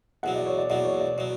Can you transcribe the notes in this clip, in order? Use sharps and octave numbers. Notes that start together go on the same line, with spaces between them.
E2 B2 F#3 F#5
D5
C#5
D5
E2 B2 F#3 D5
C#5
D5
B2 F#3 C#5